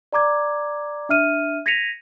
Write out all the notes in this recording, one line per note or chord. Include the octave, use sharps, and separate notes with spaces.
D5 A#5 D6 G#6
D4 E5 F6 D#7
G#6 A#6 B6 C#7 D#7 F7